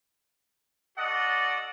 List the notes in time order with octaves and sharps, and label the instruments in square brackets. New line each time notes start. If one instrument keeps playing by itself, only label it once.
[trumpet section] F#4 A4 D5 D#5 F#5